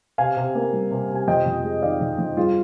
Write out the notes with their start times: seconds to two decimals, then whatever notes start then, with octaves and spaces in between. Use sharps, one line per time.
0.18 C3 F5 G#5
0.37 C3
0.55 A#3
0.73 G3
0.91 C3
1.09 C3
1.15 G#5
1.28 F2 D#5 G5
1.46 F2
1.64 G#3
1.82 D#3 D5 F5
2.01 F2
2.19 F2
2.37 G2 F4 G#4